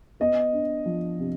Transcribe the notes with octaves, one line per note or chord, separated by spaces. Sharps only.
B3 D#5
D4
F3
C3